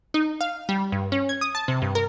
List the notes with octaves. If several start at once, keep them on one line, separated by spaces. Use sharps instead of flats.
D#4
F5
G3
G2
C#4
G#6
D#6
A5
C3
G2
A#4